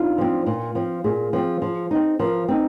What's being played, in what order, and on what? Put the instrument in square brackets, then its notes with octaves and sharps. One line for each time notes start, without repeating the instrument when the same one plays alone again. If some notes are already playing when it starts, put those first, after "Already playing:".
Already playing: [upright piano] D4 D#4 F4
[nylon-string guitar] F3 C4
A#2
F3 C4
[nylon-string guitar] A#2 [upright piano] G#4
[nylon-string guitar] F3 C4
F3
C4 D#4
[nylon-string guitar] F3 [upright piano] A#4
[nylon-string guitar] C4 D#4